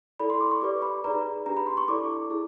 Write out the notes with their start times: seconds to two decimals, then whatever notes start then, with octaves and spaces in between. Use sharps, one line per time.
0.20 E4 A4 D5 B5
0.30 C6
0.41 D6
0.51 C#6
0.61 G4 B4 D5 D6
0.82 B5
1.04 D#4 G#4 B4 D5 A#5
1.46 D4 G4 B4 A#5
1.57 B5
1.67 C6
1.77 C#6
1.88 E4 A4 D5 D6
2.30 E4 G#4